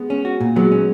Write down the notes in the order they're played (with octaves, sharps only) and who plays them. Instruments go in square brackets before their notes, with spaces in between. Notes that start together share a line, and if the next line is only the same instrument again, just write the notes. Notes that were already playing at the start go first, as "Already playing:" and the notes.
Already playing: [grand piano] G#3 B3
[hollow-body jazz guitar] C#4
F#4
A#2
[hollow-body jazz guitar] F#3 [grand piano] G#3 B3
[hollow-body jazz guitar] C#4